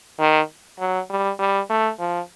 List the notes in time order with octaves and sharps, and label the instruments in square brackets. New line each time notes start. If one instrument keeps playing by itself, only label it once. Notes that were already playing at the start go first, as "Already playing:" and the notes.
[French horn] D#3
F#3
G3
G3
A3
F3